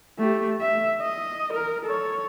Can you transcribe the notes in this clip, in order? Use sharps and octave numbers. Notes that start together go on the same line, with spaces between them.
A3 G4
E5
D#5
A#4
A4 C#5